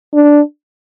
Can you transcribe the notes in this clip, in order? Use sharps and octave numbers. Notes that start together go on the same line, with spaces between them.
D4